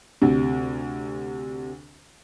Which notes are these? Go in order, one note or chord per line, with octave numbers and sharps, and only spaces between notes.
D2 C3